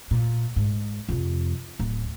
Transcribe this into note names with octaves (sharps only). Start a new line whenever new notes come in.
A#2
G#2
F2 C3
D1